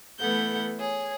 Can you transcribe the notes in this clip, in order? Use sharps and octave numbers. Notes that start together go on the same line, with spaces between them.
E3 A3 B3 A4 F#5 G6
G#4 C#5